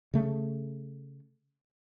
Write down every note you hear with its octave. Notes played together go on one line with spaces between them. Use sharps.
C#3 A3